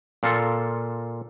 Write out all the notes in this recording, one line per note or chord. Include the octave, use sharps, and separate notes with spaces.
A#2 F4 A4